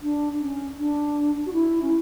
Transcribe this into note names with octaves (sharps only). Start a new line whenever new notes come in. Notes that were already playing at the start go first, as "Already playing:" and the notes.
D4
C#4
D4
F#4
E4
C#4